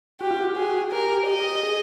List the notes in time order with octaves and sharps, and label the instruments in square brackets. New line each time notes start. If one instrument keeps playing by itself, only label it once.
[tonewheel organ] F#4 [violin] G4
[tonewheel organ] F4
F#4
[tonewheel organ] F#4 [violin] G#4
[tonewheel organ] G4 [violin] A#4
[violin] D#5
[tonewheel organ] G#4